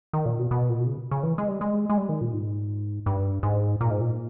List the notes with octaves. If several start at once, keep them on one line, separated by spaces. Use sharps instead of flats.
D#3
A#2
B2
B2
A#2
B2
C#3
C#3
E3
G#3
G3
G#3
G#3
G3
D#3
A#2
G#2
G2
G#2
A#2
G#2
A#2